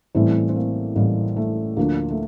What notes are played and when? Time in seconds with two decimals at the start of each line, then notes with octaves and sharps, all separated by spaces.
0.15 A1 A2 E3 G3 A3 C4
0.49 C4
0.56 A#3
0.96 A1 A2 E3 G3 A#3
1.36 A3
1.77 D2 D3 F3 A#3
2.10 A3